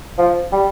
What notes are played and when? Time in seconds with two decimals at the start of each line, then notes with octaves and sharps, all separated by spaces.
0.18 F3
0.52 G3